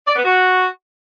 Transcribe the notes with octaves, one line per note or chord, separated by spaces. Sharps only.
D5
B3
F#4